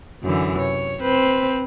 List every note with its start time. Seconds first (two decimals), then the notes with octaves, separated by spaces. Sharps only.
0.23 F#2 D3 E3
0.58 C3 C#5
1.00 C4 B4 C5